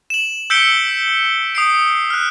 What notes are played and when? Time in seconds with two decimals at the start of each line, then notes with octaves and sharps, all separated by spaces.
0.10 E7 F#7
0.50 E6 G6 B6 C#7 D7 G7
1.55 D#6 C7 D7
2.10 F6 F#6